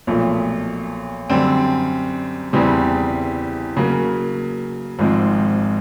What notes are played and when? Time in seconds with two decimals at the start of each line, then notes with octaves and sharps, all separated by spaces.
0.07 B1 A#2 F3 A3
1.30 F#2 D3 G3 C4
2.53 E2 C#3 E3 G3 C4
3.77 C#3 F#3 A#3
4.99 G#1 G#2 F3 G#3 C4